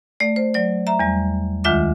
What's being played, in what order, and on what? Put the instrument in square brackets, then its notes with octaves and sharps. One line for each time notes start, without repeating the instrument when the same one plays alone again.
[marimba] A3 D5
C5
F#3 D5
E5 A#5
E2 G3
D2 D#3 G#3 F4 E5 D6